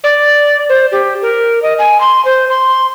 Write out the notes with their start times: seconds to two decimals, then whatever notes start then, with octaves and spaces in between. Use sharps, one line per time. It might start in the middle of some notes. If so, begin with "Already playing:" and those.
0.04 D5
0.69 C5
0.92 G4
1.22 A#4
1.62 D#5
1.79 G#5
2.01 C6
2.25 C5
2.50 C6